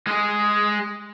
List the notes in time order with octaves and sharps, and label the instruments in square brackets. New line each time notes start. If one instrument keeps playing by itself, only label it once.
[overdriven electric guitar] G#3 G#4